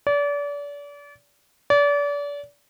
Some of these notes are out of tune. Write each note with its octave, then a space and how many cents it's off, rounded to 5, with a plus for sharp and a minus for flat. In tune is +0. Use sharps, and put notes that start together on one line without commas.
D5 -35
D5 -35